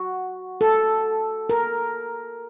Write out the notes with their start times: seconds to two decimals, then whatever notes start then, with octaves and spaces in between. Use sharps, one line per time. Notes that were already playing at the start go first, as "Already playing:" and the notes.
Already playing: F#4
0.61 A4
1.49 A#4